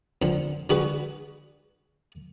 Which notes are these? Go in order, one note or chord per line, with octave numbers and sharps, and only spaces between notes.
F2 D3
D3 F#4 G#4 B4